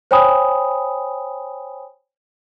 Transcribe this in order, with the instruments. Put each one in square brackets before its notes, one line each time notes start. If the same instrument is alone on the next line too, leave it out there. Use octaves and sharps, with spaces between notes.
[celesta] C5 C#5 G5 G#5 B5 D#6